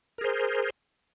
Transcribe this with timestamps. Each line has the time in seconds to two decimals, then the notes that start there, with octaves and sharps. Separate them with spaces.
0.18 A#4
0.21 G#4
0.24 C5